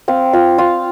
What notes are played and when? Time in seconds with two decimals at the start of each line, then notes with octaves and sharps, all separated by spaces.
0.08 C4 F5
0.33 F4 F5
0.58 F4 F5